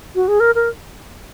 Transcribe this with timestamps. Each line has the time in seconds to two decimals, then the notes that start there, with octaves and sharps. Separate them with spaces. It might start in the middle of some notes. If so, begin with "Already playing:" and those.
0.15 F#4
0.28 G#4
0.40 A#4
0.55 A#4